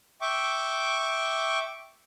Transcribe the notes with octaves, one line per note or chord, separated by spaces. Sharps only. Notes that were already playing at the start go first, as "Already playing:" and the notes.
E5 G5 C#6 D6